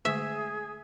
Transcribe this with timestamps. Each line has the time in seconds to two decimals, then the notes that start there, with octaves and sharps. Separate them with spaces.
0.05 D3 G#3 A3 G#4 E5